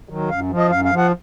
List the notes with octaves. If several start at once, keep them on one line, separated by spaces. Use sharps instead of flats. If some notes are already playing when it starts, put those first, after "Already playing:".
D#3 F#3
F#2 F5
F3
D#5
F#2 F5
F5
F3
F#5